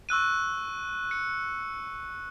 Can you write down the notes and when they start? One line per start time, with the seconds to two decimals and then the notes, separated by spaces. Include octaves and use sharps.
0.09 C#6 E6 F#6 D#7
1.11 C#7